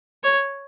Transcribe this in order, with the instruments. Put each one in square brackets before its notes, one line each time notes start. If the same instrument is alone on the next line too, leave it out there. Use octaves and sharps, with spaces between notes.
[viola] C#5